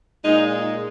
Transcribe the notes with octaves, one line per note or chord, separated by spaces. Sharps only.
A#2 G#3 D#4